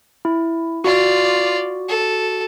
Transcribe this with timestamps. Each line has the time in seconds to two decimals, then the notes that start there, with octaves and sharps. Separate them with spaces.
0.25 E4
0.84 F4 F#4 D5
1.89 A4